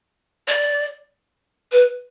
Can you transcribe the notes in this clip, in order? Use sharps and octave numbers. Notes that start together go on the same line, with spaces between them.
D5
B4